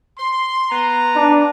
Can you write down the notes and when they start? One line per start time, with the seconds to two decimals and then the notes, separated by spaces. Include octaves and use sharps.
0.18 C6
0.70 B3 A#5
1.16 D4